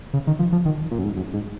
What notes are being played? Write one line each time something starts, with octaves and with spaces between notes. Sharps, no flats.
C#3
D#3
F3
F3
D#3
A#2
F#2
G#2
F#2
G#2